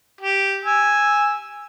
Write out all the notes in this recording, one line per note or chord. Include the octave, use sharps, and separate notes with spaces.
G4
G#5 E6